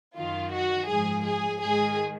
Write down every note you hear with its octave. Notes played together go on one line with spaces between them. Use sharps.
F#2 D#3 F4
F#4
G#2 F3 G#4
G#4
G#2 D#3 G#4